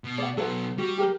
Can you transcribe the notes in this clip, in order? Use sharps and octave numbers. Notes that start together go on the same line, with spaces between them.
B2
D5 F#5
B2 F#3 A4 B4 F#5
G3 F#4
G4 A#4